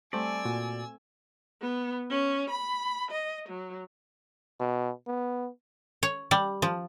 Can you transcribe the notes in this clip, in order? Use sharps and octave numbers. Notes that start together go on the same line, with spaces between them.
G3 A3 C4 C5 D5 G#5 E6
A#2 F#4
B3
C#4
B5
D#5
F#3
B2
B3
C#5
G3
F3